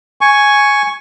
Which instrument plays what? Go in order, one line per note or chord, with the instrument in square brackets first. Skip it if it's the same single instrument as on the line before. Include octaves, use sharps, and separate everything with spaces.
[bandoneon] G#5 C#6